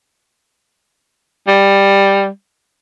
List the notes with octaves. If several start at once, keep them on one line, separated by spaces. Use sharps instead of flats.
G3